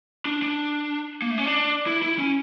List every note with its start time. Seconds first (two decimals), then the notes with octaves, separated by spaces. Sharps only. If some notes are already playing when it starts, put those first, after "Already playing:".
0.25 D4
0.42 D4
1.22 A#3
1.30 A3
1.38 C#4
1.46 D4
1.87 E4
2.02 E4
2.18 C#4